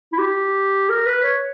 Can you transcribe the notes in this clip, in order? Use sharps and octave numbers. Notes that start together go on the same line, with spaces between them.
E4
G4
A#4
B4
C#5